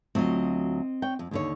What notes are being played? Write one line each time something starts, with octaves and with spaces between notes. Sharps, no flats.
D2 F#3 C4 F4 D#5
C#5 G5
F2
D#2 D3 C#5